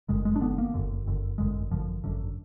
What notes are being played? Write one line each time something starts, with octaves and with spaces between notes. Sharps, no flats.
F#1 F#2 D3 G#3
G#3
D4
F#1 F#2 D3 B3
A#3
F#1 F#2 D3
F#1 F#2 D3
G#1 F#2 D3 G#3
G#1 F#2 D3 F3
G#1 F#2 D3